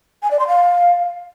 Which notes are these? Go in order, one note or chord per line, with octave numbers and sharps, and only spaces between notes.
G#5
D5
C6
F5